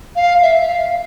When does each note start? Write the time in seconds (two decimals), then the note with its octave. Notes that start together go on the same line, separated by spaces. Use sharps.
0.16 F5
0.42 E5
0.67 F5